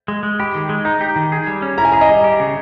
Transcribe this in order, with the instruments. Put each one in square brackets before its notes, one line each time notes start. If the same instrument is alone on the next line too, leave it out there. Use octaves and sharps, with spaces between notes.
[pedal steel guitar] G#3
G#3
[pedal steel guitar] G4 [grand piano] B5
[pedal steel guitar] D#3
G#3
[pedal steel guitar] D#4 [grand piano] A#5
[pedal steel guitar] G4
D#3
G#4
G3
C#4
[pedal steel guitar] E4 [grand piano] A#5
[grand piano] G#5
[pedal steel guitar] G#4 [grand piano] A#5
[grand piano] D#5
[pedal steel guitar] G3
G4
C#3